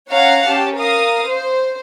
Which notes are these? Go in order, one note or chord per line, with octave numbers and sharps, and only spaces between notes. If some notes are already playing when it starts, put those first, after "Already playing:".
C#4 C#5 F5 F#5 A#5
C#4 G4 A5
A#4 F5 D#6
C5